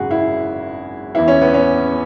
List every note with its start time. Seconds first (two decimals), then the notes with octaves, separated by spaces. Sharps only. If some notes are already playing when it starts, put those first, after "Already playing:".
Already playing: G#1 F#2 C#3 F#4 G#4
0.11 E4
1.15 E2 E3 E4
1.28 C#4
1.42 B3
1.54 C#4